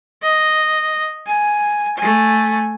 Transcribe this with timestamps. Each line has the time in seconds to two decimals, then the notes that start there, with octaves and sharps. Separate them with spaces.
0.22 D#5
1.26 G#5
1.97 A3 G#5